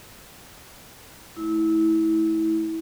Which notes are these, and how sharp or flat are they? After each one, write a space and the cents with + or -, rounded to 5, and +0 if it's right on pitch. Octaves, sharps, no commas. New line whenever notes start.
A3 -25 E4 -25